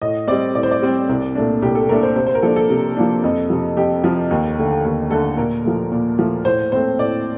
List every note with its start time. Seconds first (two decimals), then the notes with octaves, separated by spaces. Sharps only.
0.02 A2 D#5
0.28 G3 C4 D5
0.55 A2 D5
0.63 C5
0.71 D5
0.82 G3 C4
1.09 C2
1.35 A#2 A3 D4
1.62 C2 G4
1.75 A4
1.89 A#2 A3 D4 A#4
2.03 C5
2.16 C3 C5
2.27 C5
2.35 A#4
2.42 F3 A#3 D4 A4
2.56 A4
2.70 C3
2.97 F3 A#3 D4
3.24 F2
3.50 C3 F3
3.77 F2 G4
4.04 C3 F3
4.31 D#2
4.58 D3 A3
4.85 D#2
5.11 D3 A3 A4
5.37 A#2 A#4
5.65 F3 A3
5.92 A#2
6.19 F3 A3
6.45 A2 C5
6.72 A3 C4 C5
6.99 A2 D5